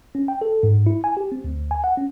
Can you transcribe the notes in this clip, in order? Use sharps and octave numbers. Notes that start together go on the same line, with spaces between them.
C#4
G5
A4
G#2
E4
G#5
G4
C4
D2
G#5
F#5
C#4